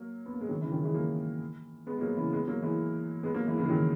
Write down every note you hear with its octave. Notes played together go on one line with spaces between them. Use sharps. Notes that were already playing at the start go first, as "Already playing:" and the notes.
Already playing: F#3 A#3
B3
A#3
G#3
D#3 F#3
C#3 E3
D#3 F#3
E3 G#3
F#3 A#3
G#3 B3
G#3
F#3 A#3
C#3 E3
G#3 B3
F#3 A#3
E3 G#3
G#3 B3
F#3 A#3
E3 G#3
C#3 E3
G#3
D#3 F#3